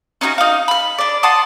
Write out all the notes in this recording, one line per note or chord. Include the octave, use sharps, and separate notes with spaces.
C#4 D#4 E4 F#4
D#4 F5
B5 F6
D4 D5
F#5 A5 C6 D#6